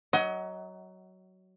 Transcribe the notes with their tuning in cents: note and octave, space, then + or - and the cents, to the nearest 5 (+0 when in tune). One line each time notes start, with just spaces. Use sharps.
F#3 +15 D#5 +30 F#5 +25